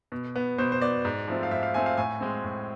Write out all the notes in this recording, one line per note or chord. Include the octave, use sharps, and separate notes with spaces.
B2
B3
B2 C5
C5
B3 D5
G#2
F3 A3 C4
F5
G#2 E5
F5
F3 A3 C4 G#5
F5
A2 G#5
G#3 C4
A2